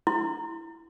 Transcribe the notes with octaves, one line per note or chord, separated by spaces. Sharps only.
E4